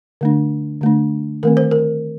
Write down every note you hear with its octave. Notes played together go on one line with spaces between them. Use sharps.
D3 A3 D4
D3 A3 D4
D#3 A3 C4 A#4
C5
A#4